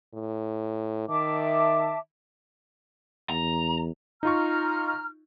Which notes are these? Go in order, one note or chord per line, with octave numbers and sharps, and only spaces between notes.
A2
D#3 E5 A5 D6
E2 A#5
D#4 F4 A#5 C#6 F6